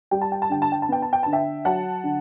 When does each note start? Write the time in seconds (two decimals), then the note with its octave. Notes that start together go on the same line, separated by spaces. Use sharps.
0.11 G3 G5
0.21 A5
0.32 G5
0.42 A5
0.50 D3 G5
0.62 A5
0.72 G5
0.82 A5
0.89 B3 G5
1.02 A5
1.13 G5
1.23 D3 A5
1.33 E5 G5
1.65 F#3 F#5 A5
2.04 D3